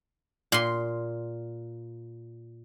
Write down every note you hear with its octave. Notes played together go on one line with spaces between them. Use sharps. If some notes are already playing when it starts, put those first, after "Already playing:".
A#2 C6